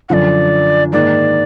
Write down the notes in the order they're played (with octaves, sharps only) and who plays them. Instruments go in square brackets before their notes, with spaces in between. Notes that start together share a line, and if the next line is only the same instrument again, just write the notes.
[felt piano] F#2 D3 F3 [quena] D5 F#5
[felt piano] G#2 D#3 A#3 [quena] D5